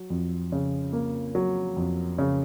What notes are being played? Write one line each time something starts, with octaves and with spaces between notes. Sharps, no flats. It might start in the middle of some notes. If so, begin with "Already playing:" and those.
Already playing: F#3
F2
C#3
A#3
F#3
F2
C#3